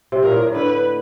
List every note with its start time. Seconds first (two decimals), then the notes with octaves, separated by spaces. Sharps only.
0.12 C3
0.23 A#2 A#4
0.31 A2
0.47 A2
0.55 D3 B4